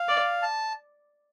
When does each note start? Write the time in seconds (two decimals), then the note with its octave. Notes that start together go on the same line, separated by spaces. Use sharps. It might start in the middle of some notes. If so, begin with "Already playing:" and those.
Already playing: F5
0.08 D5
0.42 A5